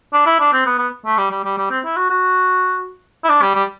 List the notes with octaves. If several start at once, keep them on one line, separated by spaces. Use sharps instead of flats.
D4
E4
D4
C4
B3
B3
A3
G3
G3
G3
G3
C4
E4
F#4
F#4
E4
D4
G3
G3